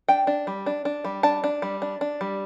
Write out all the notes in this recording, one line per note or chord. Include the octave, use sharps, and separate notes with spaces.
D4 G5
D4
G3
D4
D4
G3
D4 A5
D4
G3
D4
D4
G3